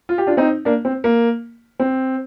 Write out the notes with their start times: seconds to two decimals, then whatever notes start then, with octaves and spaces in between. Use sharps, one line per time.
0.09 F4
0.18 G4
0.27 D4 F4
0.37 C4 D#4
0.65 A#3 D4
0.85 C4
1.04 A#3
1.79 C4